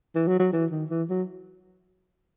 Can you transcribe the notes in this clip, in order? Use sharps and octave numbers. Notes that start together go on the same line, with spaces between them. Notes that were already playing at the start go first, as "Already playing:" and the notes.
E3
F#3
F#3
E3
D#3
E3
F#3